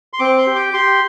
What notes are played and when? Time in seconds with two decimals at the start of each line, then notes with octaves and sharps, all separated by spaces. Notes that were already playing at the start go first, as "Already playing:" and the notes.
0.13 C6
0.19 C4 D6
0.38 C6
0.47 G4
0.55 D6
0.73 G4 C6